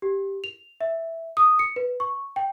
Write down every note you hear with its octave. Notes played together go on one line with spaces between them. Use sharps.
G4
F7
E5
D#6
C#7
B4
C#6
G5